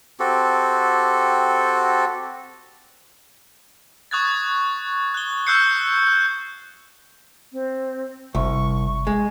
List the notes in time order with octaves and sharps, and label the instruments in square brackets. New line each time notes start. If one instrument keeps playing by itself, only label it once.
[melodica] C4 F#4 G4 A4
[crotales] C#6 D#6 F#6 G#6 A6
F#6 G7
C#6 E6 F#6 G6 C7 C#7
F#6
[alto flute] C4
[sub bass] G1 [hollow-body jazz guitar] C2 [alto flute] C#6
[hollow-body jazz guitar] G#3